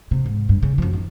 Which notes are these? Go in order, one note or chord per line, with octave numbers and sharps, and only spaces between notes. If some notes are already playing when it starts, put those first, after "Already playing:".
C3
G#2
G2
C#3
F#2 F3
D#3